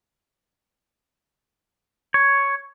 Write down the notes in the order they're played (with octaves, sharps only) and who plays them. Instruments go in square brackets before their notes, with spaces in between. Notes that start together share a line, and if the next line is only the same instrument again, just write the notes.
[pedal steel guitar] C#5